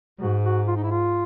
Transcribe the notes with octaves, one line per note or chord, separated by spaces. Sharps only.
G#2 F#4
F#4
F4
D#4
E4
F4